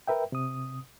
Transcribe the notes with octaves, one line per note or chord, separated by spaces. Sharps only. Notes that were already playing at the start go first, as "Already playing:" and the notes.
A#4 B4 E5 G5
C3 D#6